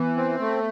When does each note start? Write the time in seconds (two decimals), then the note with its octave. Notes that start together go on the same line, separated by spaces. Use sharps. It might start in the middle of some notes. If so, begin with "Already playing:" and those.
Already playing: E3 B3
0.17 C4
0.40 A3